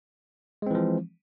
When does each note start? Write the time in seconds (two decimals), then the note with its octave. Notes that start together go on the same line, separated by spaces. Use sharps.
0.62 G#3
0.66 C4
0.71 E3
0.75 F3